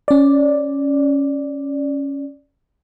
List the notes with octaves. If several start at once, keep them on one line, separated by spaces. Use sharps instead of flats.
C#4 D5